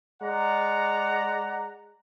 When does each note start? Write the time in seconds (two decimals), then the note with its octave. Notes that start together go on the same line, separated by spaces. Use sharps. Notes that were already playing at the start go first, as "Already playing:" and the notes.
0.22 G#3 D5 F#5 A#5